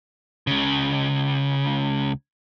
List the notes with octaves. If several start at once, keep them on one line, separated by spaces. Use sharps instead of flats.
C#2 C#3